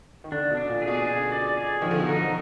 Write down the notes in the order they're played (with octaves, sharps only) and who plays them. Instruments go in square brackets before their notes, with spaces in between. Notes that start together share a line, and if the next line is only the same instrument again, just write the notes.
[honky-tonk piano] D#3
[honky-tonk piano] D3 [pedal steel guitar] D4
[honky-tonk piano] B2
[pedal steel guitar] D4
[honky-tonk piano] A#2
[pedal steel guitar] G#4
[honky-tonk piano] B2
[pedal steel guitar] G#4
D5
G#4
[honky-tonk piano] D#3 [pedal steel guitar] F3
[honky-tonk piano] D3
B2
[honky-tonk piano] D3 [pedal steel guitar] D#4